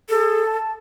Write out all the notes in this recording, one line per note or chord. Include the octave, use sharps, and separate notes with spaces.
G#4 A4
A5